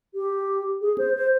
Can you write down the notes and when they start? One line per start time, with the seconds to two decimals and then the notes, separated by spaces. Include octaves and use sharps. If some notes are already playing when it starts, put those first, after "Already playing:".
0.14 G4
0.82 G#4
0.98 C5
1.15 C5